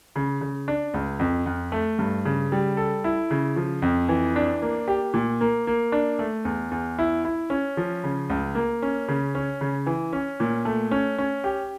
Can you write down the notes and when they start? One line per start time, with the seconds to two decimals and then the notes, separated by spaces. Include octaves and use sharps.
0.16 C#3
0.41 C#3
0.68 D4
0.94 C#2
1.19 F2
1.46 F2
1.72 A3
1.99 G2
2.25 C#3
2.52 G3
2.77 A4
3.04 E4
3.30 C#3
3.56 F3
3.82 F2
4.09 E3
4.36 D4
4.62 A#3
4.88 G4
5.13 A#2
5.41 A#3
5.67 A#3
5.92 D4
6.19 A3
6.45 E2
6.71 E2
6.99 E4
7.25 E4
7.50 C#4
7.77 F3
8.04 C#3
8.30 C#2
8.55 A#3
8.82 C#4
9.08 C#3
9.35 C#4
9.61 C#3
9.86 E3
10.13 C#4
10.40 A#2
10.65 A3
10.91 C#4
11.18 C#4
11.44 G4